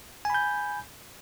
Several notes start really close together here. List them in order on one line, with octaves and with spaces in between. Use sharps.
G#5 B5 G6